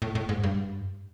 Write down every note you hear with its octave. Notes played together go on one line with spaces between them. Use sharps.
A2
A2
G#2
G2